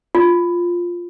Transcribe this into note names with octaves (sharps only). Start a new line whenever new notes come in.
F4